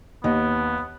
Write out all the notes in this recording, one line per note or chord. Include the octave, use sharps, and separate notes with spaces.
D#2 B3 D#5